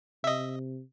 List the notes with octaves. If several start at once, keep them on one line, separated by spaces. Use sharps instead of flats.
C3 D#5 E5